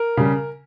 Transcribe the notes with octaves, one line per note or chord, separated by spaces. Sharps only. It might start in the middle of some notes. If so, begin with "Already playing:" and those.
Already playing: A#4
C#3 G3